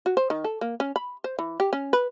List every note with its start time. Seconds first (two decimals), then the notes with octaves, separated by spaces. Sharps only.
0.06 F#4
0.17 C5
0.30 D#3
0.44 A4
0.61 A#3
0.80 C#4
0.96 B5
1.24 C5
1.39 E3
1.60 G4
1.73 C#4
1.93 B4